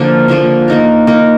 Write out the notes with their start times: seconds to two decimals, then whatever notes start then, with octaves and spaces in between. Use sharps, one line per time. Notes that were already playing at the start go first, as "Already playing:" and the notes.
Already playing: D3 F3 A#3 F4
0.28 D3 F3 A#3 F4
0.68 A#3 D#4 A#4
1.07 A#3 D#4 A#4